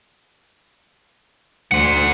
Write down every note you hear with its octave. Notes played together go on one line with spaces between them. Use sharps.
D2 C5 F#5